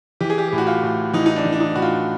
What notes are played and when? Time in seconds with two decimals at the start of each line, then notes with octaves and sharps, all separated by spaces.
0.21 E3 G4
0.30 G#4
0.38 G4
0.48 A2 G4
0.58 F#4
0.67 F4
0.83 A2
1.13 E3 D#4
1.26 D#4
1.36 D4
1.45 E3
1.53 D4
1.60 D#4
1.75 A2 F#4
1.82 F4